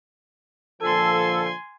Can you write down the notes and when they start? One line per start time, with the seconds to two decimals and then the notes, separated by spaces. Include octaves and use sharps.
0.82 A#2 D3 F3 A4 G#5 C6